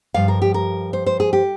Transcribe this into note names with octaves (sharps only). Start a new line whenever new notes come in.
G2 F3 F5
A#4
G4
A#4
C5
C5
G#4
G4